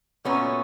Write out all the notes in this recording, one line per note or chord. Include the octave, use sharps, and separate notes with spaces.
A#2 F#3 A3 B3 C#4